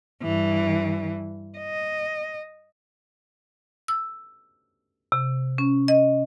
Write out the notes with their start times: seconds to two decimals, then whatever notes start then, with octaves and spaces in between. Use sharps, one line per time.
0.22 G2 E3
1.58 D#5
3.88 E6
5.12 C3
5.58 C#4
5.88 D#5